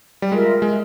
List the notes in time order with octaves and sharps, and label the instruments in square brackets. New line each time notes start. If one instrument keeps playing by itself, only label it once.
[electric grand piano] G3
[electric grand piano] G#3 [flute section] F4 A#4 E5
[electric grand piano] G#3